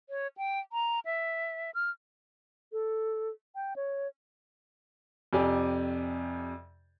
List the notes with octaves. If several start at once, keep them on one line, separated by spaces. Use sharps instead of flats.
C#5
G5
A#5
E5
F6
A4
G5
C#5
F2 C3 G4 D5 G#5